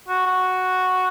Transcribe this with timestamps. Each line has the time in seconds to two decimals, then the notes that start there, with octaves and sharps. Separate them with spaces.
0.08 F#4
0.26 F#4